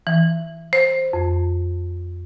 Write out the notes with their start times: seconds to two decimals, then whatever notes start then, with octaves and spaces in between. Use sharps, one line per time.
0.07 E3
0.73 C5
1.13 F2